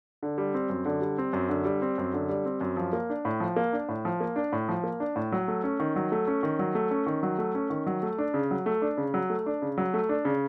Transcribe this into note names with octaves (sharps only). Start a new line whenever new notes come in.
D3
G3
C4
F#2
D3
G3
C4
F#2
D3
G3
C4
F#2
D3
G3
C4
F#2
F3
A#3
D4
A2
F3
A#3
D4
A2
F3
A#3
D4
A2
F3
A#3
D4
A2
F#3
A3
C#4
D#3
F#3
A3
C#4
D#3
F#3
A3
C#4
D#3
F#3
A3
C#4
D#3
F#3
A3
D4
C#3
F#3
A3
D4
C#3
F#3
A3
D4
C#3
F#3
A3
D4
C#3